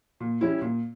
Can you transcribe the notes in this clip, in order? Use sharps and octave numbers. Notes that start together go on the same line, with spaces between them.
A#2
G3 C#4 E4
A#2